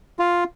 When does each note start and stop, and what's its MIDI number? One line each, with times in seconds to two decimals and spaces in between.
0.19 0.44 65